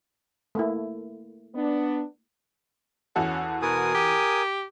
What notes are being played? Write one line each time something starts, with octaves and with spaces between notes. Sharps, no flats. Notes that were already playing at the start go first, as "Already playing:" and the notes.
A3 A#3 E4
B3 D4
E2 C#4 F#4 A4
B2 A#4 G#5 D#6
G4